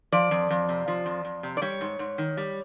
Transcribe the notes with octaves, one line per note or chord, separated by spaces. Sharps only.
F3 D5
F2
F2
C3
F3
F2
F2
C3
D5
G3 C#5
G#2
G#2
D#3
G3